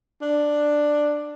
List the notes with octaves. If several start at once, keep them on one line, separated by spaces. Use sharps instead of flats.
D4